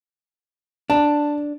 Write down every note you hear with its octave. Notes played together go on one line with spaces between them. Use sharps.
D4 A5